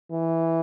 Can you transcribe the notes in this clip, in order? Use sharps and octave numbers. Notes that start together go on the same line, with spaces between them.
E3